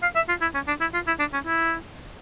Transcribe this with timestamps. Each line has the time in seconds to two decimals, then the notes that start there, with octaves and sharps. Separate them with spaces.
0.02 F5
0.15 E5
0.29 F4
0.42 E4
0.54 C#4
0.68 D4
0.81 E4
0.94 F4
1.07 E4
1.19 D4
1.33 C#4
1.46 E4